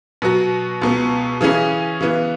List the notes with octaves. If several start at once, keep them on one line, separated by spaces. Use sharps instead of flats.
B2 F#3 B3 F#4
C#2 B2 B3
C#3 E3 C#4 G#4
C#3 E3 B3